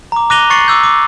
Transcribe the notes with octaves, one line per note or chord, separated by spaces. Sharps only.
A#5 D6
D6 F#6 A#6 D#7 F7 G7
C#6 A6 C7 C#7 F#7
D6 E6 G6
D6